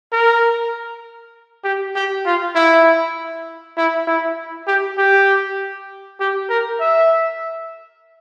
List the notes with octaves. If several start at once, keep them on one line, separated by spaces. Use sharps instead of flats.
A#4
G4
G4
F4
E4
E4
E4
G4
G4
G4
A#4
E5